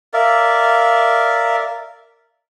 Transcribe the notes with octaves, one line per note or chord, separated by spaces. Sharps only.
A#4 D5 E5 F5